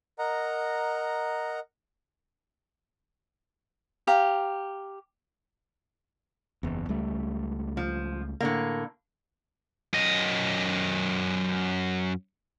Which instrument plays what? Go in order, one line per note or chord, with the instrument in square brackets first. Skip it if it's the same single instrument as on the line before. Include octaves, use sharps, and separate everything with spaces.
[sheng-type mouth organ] A#4 D#5 F#5 A#5
[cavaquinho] G4 F5 A#5
[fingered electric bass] F#1 E2
C#2 G3 A3
[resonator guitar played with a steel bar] F3
A2 D3 A#3
[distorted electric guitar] F#2 D#5